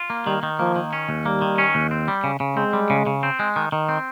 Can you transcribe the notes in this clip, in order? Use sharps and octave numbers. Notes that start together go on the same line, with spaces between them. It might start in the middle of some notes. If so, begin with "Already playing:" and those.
Already playing: F4
A#3
D#3 G3
D#3
F3 A#3
D#3
C#4
D#2
G3 A#3
D#3
C#4
D#2
C4
G3
C#3
C#3
G#3 C4
G3
C#3
C#3
C4
G#3
D#3
D#3
C4